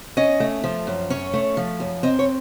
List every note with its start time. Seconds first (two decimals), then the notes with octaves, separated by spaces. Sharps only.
0.17 C#4 D#5
0.40 A3
0.64 F3
0.87 F#2
1.10 C#4 C#5
1.33 A3
1.57 F3
1.80 F#2
2.03 C4 D#5
2.19 C#5